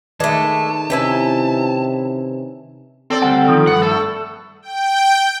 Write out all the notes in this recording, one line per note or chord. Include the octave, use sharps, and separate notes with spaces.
D#3 G#3 A3 B4 D5 A5
C3 C#4 D#4 E4 B4 E5 G5
C4 A4 D5
D2 G3 F#5
D#3 F3
G2 B3 F#5
A3 A4
G5